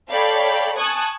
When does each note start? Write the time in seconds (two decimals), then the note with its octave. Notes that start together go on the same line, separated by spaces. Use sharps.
0.11 A4 C#5 D5 F5 G5 B5
0.77 G#5 A5 C#6 D#6 F#6 G#6